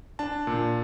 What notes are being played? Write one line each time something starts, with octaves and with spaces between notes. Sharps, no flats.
D4 A5
A#2